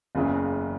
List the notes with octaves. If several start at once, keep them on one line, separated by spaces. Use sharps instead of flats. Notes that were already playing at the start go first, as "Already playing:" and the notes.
F#1 E2 C#3 E3 F4